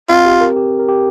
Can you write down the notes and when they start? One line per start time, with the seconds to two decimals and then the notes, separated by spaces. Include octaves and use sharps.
0.09 C4 F4
0.26 G4
0.41 A#4
0.56 G4
0.79 A#4
0.88 G4